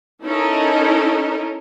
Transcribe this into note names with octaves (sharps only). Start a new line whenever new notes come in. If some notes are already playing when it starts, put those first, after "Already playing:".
C#4 D#4 E4 A4 A#4 D#5